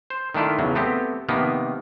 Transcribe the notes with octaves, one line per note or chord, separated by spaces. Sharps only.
C5
D#3 A3 D4 E4 F4
E2 C#3 F#3
A3 B3 C4 G4
C3 D#3 F3 A#3 B3